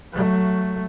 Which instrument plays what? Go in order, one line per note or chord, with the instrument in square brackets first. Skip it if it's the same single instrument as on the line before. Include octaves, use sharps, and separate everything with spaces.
[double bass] F#3 A3